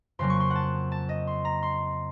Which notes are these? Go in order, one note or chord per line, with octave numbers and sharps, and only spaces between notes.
F2 C#3 F#3 A#3 C6
C#6
C6
F#5
A5
A5
D#5
C6
A#5
C6